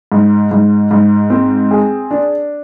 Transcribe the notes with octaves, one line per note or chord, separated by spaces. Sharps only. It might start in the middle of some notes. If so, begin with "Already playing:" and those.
G#2
G#2
G#2
C4
G#4
D4